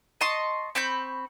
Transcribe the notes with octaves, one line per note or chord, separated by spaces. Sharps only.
D#5 A5 C6 C#6
C4 B5 C#6 G6